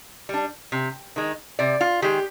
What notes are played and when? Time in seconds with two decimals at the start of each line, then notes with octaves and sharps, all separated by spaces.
0.29 G3 D4
0.72 C3
1.16 D#3 G#3
1.59 C3 D5
1.81 F4
2.02 D#3 G#3 G4